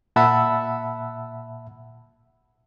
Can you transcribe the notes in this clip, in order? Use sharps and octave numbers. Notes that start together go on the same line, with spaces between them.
A#2 E5 F#5 A5 B5 E6